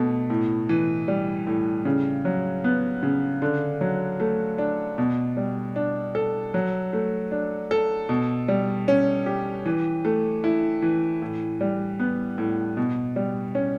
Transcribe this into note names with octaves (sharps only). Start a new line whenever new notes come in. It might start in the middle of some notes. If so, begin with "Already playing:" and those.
Already playing: B2 A3
A2
E3
G3
A2
C#3
F#3
B3
C#3
D3
F#3
A3
D4
B2
G3
D4
A4
F#3
A3
D4
A4
B2
G3
C#4
G4
E3
A3
E4
E3
A2
G3
B3
A2
B2
G3
C#4